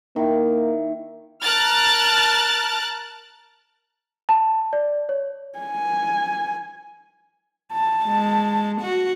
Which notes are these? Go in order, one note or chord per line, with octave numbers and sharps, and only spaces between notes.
D#3 A#3 E4
A#4 A5 F6 F#6 A6
A5
D5
C#5
G#5
A5
G#3
F#4